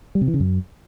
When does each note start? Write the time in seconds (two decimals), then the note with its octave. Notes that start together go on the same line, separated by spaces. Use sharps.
0.15 G3
0.21 C3
0.28 E3
0.34 C#3
0.40 F#2